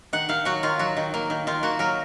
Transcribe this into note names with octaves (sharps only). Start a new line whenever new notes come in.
D#3 F#5
D#3 F5
F#3 F#4
D#3 F4
F#3 F#4
D#3
A#3
D#3
D#3 F4
A#3 F#4
F#3 A#4